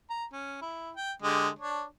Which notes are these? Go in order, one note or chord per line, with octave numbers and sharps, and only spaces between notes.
A#5
C#4
E4
G5
D3 G#3 G4
D4 C#5